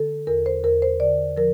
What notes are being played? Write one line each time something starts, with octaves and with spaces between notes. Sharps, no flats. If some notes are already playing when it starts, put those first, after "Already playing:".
Already playing: D3 A4
E2 A#4
C5
E2 A#4
C5
D3 D5
F3 A#4